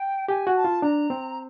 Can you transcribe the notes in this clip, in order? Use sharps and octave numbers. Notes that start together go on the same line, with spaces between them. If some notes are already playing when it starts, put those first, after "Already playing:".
Already playing: G5
G4 G#5
F#4
A5
F4
D4 A#5
C4